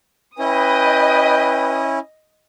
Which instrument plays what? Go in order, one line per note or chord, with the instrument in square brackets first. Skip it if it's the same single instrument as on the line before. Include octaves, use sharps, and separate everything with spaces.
[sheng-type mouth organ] C#4 E4 [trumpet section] B4 G5 [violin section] D#5 D#6